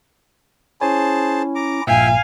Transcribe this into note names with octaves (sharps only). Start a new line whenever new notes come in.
C#4 E4 G#4 C5 C#5 G#5 A5
A#5 D6
A#1 G2 A#2 E5 F5 G5 G#5